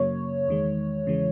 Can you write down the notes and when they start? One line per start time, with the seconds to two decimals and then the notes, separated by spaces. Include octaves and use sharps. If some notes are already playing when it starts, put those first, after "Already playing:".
Already playing: F#2 C#3 F#3 A#3 C#5
0.48 E2 D#3 G#3
1.07 E2 C#3 E3 G#3